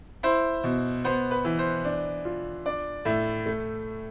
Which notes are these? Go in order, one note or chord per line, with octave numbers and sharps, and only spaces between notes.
E4 C5
B2
B3 C5
B4
E3
C5
D4
F4
D4 D5
A2 E5
A3